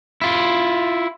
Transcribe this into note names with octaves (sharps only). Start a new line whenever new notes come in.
E4 F4